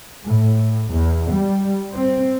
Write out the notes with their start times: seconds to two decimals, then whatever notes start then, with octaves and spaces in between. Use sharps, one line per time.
0.25 A2
0.94 E2
1.32 G3
1.95 C4